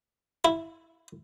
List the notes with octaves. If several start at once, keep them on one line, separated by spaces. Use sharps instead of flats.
E4